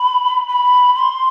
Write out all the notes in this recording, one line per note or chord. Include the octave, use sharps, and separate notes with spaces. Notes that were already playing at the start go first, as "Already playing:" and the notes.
Already playing: B5
B5
C6